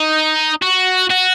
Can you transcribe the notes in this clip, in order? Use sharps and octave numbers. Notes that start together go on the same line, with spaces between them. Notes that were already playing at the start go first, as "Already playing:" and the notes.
Already playing: D#4
F#4
F#4